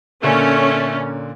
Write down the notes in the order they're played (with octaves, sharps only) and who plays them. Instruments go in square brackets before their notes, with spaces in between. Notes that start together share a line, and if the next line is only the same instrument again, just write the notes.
[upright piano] A#2 D3 A#4 [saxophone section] A3 [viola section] C#4